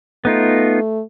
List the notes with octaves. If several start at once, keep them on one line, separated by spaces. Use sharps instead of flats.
A3 B3 D#4 F4